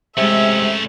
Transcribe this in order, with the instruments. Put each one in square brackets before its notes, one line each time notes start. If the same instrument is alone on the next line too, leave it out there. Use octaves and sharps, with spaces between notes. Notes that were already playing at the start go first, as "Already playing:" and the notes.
[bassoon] C3 [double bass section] G#3 [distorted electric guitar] A3 C#4 [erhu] E5